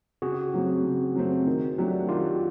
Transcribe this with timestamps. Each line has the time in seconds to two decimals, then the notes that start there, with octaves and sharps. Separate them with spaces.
0.22 C#3 F#4 G#4
0.54 F#3 A3 C4
0.84 C#3
1.16 F#3 A3 C4
1.47 D#3
1.78 F#3 A3 D4 G4
2.09 D#3 F4 G4